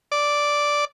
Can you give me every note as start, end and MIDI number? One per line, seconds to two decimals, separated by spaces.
0.12 0.85 74